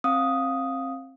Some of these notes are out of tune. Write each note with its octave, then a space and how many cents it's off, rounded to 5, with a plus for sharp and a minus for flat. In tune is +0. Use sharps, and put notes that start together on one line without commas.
C4 +25 F5 +0 D#6 +0